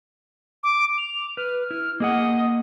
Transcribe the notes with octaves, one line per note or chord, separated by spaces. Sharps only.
D6
F7
B4 F6
E4 F6
A#3 G#4 D#5 F#5